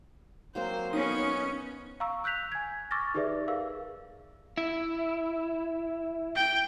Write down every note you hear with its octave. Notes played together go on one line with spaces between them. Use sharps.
F#3 A#3 C4 C5
B3 C#4 D#4 C#6 D#6
F5 A#5 C#6 E6
E6 F#6 G6 B6 F7
G#5 G#6
C#6 D6 E6 F6 A6 A#6
D#4 G4 G#4 B4 D5 E5
G#4 A#4 F5 E6
E4
G5